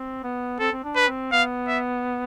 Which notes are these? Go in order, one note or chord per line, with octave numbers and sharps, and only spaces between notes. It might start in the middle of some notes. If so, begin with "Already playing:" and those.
Already playing: C4
B3
C4 A4
C4
D4
B4
C4
B3 F5
E5